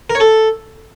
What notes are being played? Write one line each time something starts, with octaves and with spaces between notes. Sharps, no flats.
A#4
C#5
A4